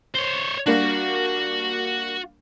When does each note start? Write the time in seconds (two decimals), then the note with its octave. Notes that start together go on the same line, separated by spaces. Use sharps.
0.14 C5 C#5
0.66 G3 A#3 D4 F#4